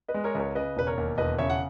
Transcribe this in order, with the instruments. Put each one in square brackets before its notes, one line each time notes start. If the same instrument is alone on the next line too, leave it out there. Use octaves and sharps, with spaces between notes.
[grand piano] B4 D#5
G#3
A#4 C#5
C#2 A#4 C#5
C#3 B4 D#5
E1 B4
A#4 C#5
D#2
E1 B4 D#5
C#3 C#5 E5
F#5